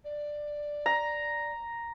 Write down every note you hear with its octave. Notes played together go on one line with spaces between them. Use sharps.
D5
A#5